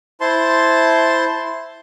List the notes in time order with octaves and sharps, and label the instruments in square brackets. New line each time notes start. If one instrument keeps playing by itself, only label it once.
[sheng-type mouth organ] E4 C5 A5 C6